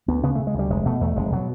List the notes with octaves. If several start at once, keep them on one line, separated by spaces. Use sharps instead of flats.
D2 B3
C#3 B3
C#3 A3
G#3
D2 G3
F1 G#3
B2 A3
E2 A3
F1 G#3
B2 F#3